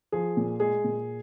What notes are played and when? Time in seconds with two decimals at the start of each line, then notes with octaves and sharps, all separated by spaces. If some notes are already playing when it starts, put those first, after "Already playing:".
0.12 F3 G#4
0.37 A#2
0.60 G#3 G#4
0.84 A#2